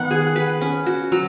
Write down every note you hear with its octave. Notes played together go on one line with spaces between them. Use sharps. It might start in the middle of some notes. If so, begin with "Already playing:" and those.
Already playing: D#3 B3 F#5
G#4
B4
C#4
F#4
F#3